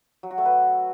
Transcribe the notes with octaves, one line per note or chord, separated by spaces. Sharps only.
F#3
F#4
A3
B4